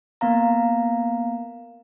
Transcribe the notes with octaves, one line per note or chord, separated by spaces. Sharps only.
A#3 B3 F5 A#5